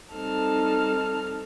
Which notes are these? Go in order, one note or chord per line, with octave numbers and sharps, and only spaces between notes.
G3 C4 D#4 A4 A5 F6